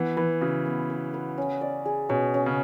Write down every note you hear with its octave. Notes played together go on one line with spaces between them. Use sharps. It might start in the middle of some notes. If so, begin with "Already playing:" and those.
Already playing: E3 B3
E3 B4
C#3 F#4
B3
B3
B4
C#4
D5
G#4
B2 C#4
C#4
C#3